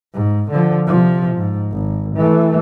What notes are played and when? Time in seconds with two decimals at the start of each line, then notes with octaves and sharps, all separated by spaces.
0.14 G#2
0.51 D3 F3
0.87 C3 F3
1.36 G#2
1.71 G#1
2.16 E3 A3